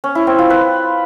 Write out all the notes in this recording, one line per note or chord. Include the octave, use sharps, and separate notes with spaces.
C#4
E4
C4
F4
B4